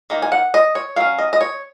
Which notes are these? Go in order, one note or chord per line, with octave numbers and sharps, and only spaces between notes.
D#3 A#3
G#5
F#5
D#5
C#5
F#3 C#4 F5
D#5
D#5
C#5